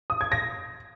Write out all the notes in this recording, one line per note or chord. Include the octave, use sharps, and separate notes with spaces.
D#6
G#6
A#6